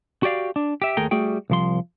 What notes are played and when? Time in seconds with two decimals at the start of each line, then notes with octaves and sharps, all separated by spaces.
0.23 F#4 G4 D5 F5
0.56 D4
0.82 G4 E5
0.97 D#2 A3 G#4 A#4 G5
1.11 G3 A3 F#4 G#4 G5
1.50 C2 F3 C6